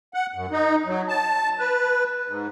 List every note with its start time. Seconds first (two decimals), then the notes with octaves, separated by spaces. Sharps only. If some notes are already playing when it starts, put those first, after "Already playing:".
0.14 F#5
0.34 F#2
0.52 D#4
0.86 F#3
1.09 A5
1.59 B4
2.28 G#2